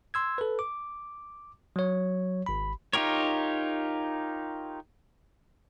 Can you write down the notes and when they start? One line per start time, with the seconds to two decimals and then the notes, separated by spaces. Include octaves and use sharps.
0.14 C6 E6 G#6
0.38 A4 B4
0.59 D6
1.76 F#3 C#5
2.46 G#1 B5
2.93 D#4 F4 G4 A#4 C#5